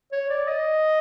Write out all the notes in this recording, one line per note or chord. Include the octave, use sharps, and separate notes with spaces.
C#5
D5
D#5